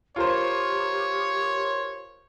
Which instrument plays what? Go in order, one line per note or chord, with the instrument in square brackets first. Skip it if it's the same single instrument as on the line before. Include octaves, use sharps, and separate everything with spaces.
[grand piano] F4 A#4 C5 [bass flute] G4 [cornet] C#5